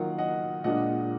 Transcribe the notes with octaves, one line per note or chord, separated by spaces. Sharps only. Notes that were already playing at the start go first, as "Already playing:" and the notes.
Already playing: D#3 F#3 A#3 F4 F#5
D#5 F#5
A#2 G#3 D4 F4 D#5 F#5